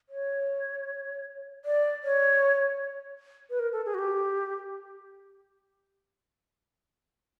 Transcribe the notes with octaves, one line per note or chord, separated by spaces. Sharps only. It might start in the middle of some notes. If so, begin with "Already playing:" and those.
C#5
D5
C#5
B4
A#4
A4
G#4
F#4
G4